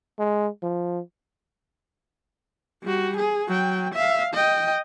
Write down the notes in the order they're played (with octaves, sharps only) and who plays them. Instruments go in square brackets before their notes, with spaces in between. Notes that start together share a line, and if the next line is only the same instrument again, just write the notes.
[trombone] G#3
F3
[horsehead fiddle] G3 F#4
G#4
F#3 G5
E5 F5
D#5 G5